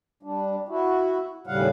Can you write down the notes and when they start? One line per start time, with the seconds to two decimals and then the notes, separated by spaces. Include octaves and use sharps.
0.23 G3 D4
0.68 E4 F#4
1.47 D#2 A2 C#3 G3 F5 F#5